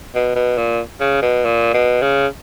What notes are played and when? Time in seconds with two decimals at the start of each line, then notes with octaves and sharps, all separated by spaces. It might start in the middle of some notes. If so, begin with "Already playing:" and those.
0.15 B2
0.36 B2
0.58 A#2
1.01 C#3
1.22 B2
1.45 A#2
1.74 B2
2.02 C#3